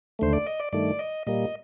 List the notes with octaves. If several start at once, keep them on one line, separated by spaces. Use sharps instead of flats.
D#2 D3 A3 C5
D5
D#5
D5
G2 D#3 A3 D5
D#5
A#2 G3 A#3 D#5